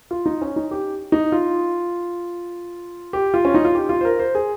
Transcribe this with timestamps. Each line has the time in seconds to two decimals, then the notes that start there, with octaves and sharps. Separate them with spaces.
0.11 F4
0.26 D#4
0.42 C#4
0.56 D#4
0.71 G4
1.12 D#4
1.32 F4
3.13 G4
3.34 F4
3.45 C#4
3.54 D#4
3.65 F4
3.75 G4
3.89 F4
4.01 C5
4.05 A#4
4.19 C5
4.35 G#4